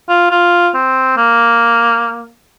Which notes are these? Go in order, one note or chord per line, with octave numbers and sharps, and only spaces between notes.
F4
F4
C4
A#3